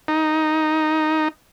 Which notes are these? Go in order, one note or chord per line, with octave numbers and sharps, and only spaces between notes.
D#4